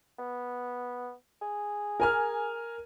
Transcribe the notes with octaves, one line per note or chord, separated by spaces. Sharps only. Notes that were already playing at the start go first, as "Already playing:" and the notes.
B3
G#4
A#4 G#5 F6